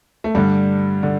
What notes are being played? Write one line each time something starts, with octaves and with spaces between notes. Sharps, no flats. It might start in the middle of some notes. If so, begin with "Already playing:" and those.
A3
G2 D3 G3
D3